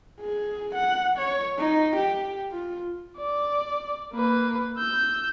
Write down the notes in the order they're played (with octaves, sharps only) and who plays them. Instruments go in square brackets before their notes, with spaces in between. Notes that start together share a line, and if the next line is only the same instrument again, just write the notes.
[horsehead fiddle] G#4
F#5
C#5
D#4
G4
F4
[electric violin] D5
A#3 B4
E6 G6